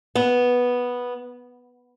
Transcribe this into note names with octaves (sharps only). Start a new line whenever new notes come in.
B3